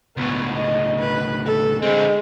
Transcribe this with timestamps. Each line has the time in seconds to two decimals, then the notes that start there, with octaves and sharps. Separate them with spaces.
0.17 C#2 A2 B3
0.57 D#5
1.00 B4
1.46 A4
1.82 D3 G#3 C4